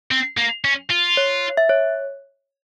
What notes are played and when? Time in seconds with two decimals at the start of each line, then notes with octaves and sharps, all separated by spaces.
0.11 C4
0.38 A#3
0.65 C#4
0.90 F4
1.17 C#5
1.57 E5
1.69 C#5